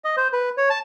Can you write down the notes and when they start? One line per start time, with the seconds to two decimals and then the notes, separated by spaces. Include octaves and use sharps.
0.04 D#5
0.17 C5
0.33 B4
0.57 C#5
0.70 A5